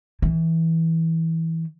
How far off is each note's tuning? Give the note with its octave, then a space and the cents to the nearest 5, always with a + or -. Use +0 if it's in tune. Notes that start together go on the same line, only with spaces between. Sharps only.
E3 -15